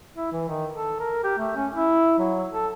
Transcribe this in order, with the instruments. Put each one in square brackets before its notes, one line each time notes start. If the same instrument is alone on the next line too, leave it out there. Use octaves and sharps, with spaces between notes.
[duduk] E4
E3
D#3
A4
A#4
G4
A3
C#4
E4
F#3
A4